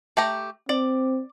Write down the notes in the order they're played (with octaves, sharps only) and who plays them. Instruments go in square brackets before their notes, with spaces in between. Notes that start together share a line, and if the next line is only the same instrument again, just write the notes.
[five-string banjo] A3 G4 A#5
[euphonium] C4 [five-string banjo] D5